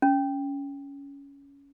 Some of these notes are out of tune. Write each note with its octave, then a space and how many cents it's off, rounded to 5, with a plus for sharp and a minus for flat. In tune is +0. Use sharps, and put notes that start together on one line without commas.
C#4 +15